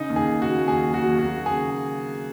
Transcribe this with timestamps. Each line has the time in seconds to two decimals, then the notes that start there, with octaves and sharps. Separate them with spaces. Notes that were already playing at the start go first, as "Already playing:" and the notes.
Already playing: C#3 D#4
0.10 D#2
0.16 G#4
0.29 C#3
0.42 F#4
0.48 D#2
0.68 D#2 G#4
0.88 F#3
0.94 F#4
1.07 D#2
1.19 F#4
1.26 D#2
1.46 C#3 G#4